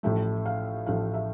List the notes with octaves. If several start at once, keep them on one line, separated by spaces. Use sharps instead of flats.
A1 A2 F3 A3 E5
F5
A1 A2 F3 A3 F5
E5